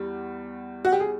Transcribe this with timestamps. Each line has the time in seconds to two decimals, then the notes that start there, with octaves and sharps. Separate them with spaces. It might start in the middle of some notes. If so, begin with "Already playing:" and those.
Already playing: E2 G3
0.85 F#4
0.92 G4
1.00 G#4